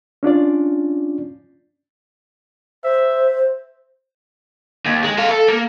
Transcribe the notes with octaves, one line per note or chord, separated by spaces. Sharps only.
C#4 D4 F4 D5
C5 E5
D#2
G#3
A4 F5
A4
A#3